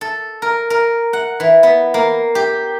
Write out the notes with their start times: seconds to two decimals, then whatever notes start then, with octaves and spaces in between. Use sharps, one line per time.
0.01 A4
0.42 A#4
0.70 A#4
1.13 F#5
1.40 E3
1.63 B3
1.94 A#3
2.35 G4